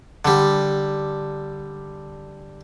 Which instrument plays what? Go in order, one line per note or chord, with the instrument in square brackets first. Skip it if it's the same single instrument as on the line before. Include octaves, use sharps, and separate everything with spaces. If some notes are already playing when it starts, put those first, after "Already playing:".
[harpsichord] D3 G3